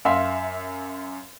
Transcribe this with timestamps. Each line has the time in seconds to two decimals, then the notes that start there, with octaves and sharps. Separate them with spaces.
0.05 F#2 E5 F5 C6